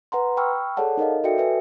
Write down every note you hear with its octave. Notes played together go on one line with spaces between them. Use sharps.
B4 F#5 A#5 C6
G5 B5 C#6 E6 F6
G#4 A4 C#5 D5 F#5 A5
D#4 A#4 D#5 F5
F#4 A4 D5 E5 G5 C#7
B4 E5 G#5